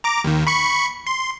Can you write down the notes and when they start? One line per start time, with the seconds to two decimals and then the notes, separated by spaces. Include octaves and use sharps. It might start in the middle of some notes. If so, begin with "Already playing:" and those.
0.04 A#5 D6
0.24 D#2 D#3
0.47 B5 C#6 C#7
1.07 C6